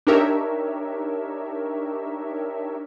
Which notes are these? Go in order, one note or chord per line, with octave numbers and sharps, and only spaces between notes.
D4 D#4 G4 A#4 C#5 E5